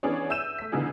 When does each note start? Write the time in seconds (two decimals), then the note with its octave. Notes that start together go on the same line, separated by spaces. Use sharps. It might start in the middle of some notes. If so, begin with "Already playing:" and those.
0.03 E3 B3 C#4 D4 G#4 C#5
0.30 E5 E6 G6 D#7 E7
0.59 A3 B6
0.72 D3 E3 B3 D#4 F4 G#4